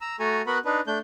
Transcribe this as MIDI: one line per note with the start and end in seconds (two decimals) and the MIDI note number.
0.01 0.16 82
0.01 0.16 88
0.20 0.42 57
0.20 0.42 66
0.20 0.42 69
0.20 0.42 80
0.20 0.42 82
0.46 0.58 59
0.46 0.58 66
0.46 0.58 70
0.46 0.58 71
0.46 0.58 78
0.46 0.58 83
0.65 0.80 62
0.65 0.80 63
0.65 0.80 71
0.87 0.99 57
0.87 0.99 62
0.87 0.99 91